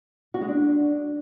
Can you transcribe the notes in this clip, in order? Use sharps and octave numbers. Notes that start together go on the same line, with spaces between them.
F#4
G#3
D4